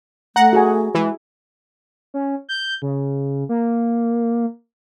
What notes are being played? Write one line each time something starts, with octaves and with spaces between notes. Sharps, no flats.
A3 F#5 A#5
F#4 G#4 G#5
E3 G#3
C#4
G6
C#3
A#3